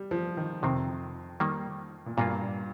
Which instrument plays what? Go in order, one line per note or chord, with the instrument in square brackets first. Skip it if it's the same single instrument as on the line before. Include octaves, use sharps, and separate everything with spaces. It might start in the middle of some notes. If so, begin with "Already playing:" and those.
Already playing: [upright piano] G3
F3
D#3
[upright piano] F2 [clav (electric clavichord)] C3 D#3 C4
[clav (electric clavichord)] D#3 G3 A#3
[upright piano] A#2
[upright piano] G2 [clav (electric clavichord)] A#2 A#3 F4